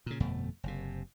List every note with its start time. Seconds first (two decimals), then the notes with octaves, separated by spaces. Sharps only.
0.06 A#2 C#3
0.20 G1 F2 B2 A3
0.63 F#1 C3